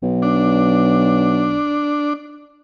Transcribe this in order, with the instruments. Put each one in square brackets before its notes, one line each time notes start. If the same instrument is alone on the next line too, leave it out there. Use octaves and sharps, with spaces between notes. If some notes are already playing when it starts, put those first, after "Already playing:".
[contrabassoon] B1
[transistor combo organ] D4